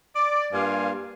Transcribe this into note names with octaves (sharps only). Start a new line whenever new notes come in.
D5
G2 A#3 F4 F5 G#5